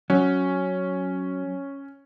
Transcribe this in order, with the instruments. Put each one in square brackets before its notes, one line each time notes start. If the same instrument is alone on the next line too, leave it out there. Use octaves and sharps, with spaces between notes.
[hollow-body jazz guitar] F#3 [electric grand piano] C#4